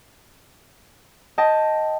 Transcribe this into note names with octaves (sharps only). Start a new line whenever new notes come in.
D#5 G5 A5